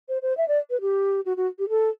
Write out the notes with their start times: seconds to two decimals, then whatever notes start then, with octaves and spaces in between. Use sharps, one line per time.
0.09 C5
0.22 C5
0.37 E5
0.48 D5
0.70 B4
0.81 G4
1.26 F#4
1.37 F#4
1.59 G4
1.69 A4